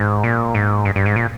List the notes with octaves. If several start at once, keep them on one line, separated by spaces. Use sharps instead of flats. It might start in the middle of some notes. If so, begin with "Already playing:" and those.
Already playing: G#2
A#2
G#2
G2
G2
G#2
A#2